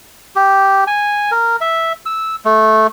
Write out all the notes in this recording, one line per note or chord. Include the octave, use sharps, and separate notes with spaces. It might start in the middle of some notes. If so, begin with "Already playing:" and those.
G4
G#5
A#4
E5
E6
A3